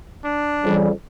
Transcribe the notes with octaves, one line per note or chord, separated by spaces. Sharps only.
D4
F2 C#3 E3 G3